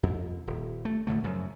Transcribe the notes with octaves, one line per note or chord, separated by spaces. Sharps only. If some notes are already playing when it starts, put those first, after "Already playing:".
F2
D#1
A3
F1 A2 D3 A3
F#2 C#3 F3